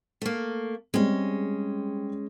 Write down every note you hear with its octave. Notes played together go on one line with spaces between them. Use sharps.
A3 A#3
G3 G#3 C4 C#4